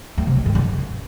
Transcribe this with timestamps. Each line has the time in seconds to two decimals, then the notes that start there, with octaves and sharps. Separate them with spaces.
0.18 A3
0.27 C3
0.36 D#3
0.46 G#2
0.55 C#3